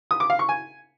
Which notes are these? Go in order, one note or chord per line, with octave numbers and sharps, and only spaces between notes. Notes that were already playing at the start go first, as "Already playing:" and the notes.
D#6
D6
F5
C#6
G#5